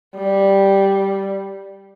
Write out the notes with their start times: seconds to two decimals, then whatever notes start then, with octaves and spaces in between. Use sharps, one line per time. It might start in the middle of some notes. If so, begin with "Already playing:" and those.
0.16 G3